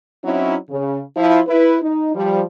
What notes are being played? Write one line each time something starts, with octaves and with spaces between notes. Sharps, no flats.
F#3 C4 C#4 D#4 E4
C#3
F3 E4
E4 B4
D#4
F3 G3